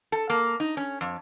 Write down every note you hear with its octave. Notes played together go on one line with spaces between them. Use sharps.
A4
A#3
D#4
C#4
F2